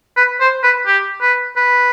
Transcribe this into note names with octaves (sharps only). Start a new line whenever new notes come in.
B4
C5
B4
G4
B4
B4